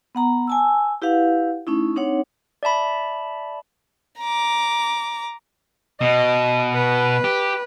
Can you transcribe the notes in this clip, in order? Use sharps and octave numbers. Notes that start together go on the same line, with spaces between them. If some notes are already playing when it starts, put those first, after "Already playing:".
B3 F#5 A#5
G#5 A5 E6
E4 G4 B4 F5 F#5
A3 C#4 D#4 E4
C4 D4 D#4 C#5 F#5
D5 E5 A5 B5
A#5 D6
B2 D#5
B4
G4